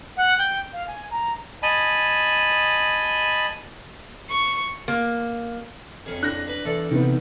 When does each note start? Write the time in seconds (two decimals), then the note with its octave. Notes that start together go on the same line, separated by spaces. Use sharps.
0.17 F#5
0.38 G5
0.73 F5
0.88 G#5
1.11 A#5
1.63 D#5 G#5 A5 B5
4.30 C#6
4.88 A#3
6.06 F2 C#4 G#4
6.23 D4 F#6 A#6
6.48 B4
6.64 E2 A4 D5
6.91 C3 D#3 B3